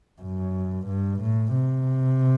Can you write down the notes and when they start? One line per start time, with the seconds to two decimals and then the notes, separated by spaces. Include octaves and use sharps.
0.21 F#2
0.87 G2
1.21 A2
1.53 C3